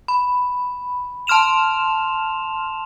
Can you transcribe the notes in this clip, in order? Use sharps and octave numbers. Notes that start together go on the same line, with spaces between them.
B5
A5 C6 F6 E7 F7